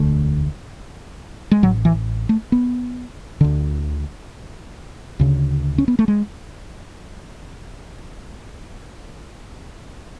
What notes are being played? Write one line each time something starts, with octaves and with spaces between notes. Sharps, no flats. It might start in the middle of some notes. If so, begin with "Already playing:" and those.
Already playing: E1 D2 D3 A3
G#3
A1 A2 F#3
E3
A3
B3
D2 D3
D2 C#3
C#4
B3
A3
G#3